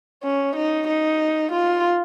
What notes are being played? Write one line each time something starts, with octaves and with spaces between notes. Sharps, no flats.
C#4
D#4
D#4
F4